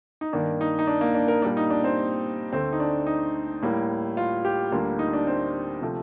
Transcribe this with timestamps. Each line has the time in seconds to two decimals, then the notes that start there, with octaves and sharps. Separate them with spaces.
0.21 D#4
0.33 G2 D#3 A#3 D4
0.61 D#4
0.79 D#4
0.87 D4
1.01 A#3
1.14 D4
1.28 A#4
1.42 A#2 G3 A#3 D4
1.57 D#4
1.70 D4
1.84 C4
2.53 D2 D3 A3 C4
2.73 D#4
2.80 D4
3.07 D#4
3.62 A2 G3 A#3
4.17 F4
4.45 G4
4.72 D2 D3 G3 A#3 F4
4.99 D#4
5.13 D4
5.27 C4
5.82 C3 F3 A3